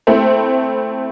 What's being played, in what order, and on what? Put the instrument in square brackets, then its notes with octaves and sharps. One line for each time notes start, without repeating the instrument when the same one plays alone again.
[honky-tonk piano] A3 C4 E4